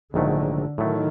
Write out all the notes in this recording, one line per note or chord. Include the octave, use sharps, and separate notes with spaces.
A#1 G#2 D3 D#3 F#3 A3
A2 D#3 F#3 A3